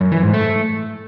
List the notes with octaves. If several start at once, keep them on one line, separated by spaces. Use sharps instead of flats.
F#2
E3
G#2
A3